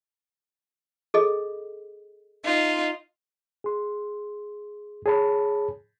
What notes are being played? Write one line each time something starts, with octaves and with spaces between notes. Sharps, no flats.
G#4 A4 D#5
D#4 F4
G#4 C6
G#4 C#5 A5 B5